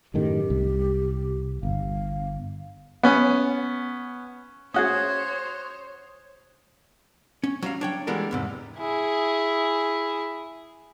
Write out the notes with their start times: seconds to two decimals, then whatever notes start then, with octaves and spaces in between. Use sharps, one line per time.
0.14 F#2 A2 D#3 G4
0.50 C2
1.63 G1 F5
3.03 B3 C#4
4.74 C#4 F#4 G#4 C5 C#5 D#6 F#6 G#6
7.44 C#4
7.62 F#3 G3 F5
7.81 D4 C#5 G5
8.07 E3 G3 G#3 B3 A4 A#4
8.31 E2 G#2 C3
8.78 E4 G#4